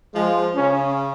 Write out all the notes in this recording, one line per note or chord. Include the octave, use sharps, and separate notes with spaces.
F3 G#3
C#3 C#4